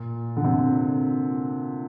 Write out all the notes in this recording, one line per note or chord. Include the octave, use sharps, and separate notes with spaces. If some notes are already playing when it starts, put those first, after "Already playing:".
Already playing: A#2
D3
C3